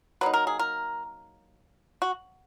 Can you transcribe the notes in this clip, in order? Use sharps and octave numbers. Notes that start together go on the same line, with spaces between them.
F#3 A#3 D#4 B4
A#4
G#4
A#4
F#4